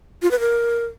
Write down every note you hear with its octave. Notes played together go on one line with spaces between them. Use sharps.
F4
B4
A#4